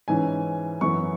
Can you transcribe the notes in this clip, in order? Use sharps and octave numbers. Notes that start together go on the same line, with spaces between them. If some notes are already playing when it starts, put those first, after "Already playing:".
G#2 E3 C#4 G#5
F#2 E3 B3 C#6